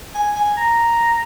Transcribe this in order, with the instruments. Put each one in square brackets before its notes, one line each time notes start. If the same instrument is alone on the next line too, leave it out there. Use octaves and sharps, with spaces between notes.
[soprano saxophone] G#5
G#5
A#5